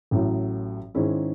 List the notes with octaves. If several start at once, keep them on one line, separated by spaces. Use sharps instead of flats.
A1 A2 F#3
G#2 D#3 G#3 C#4 E4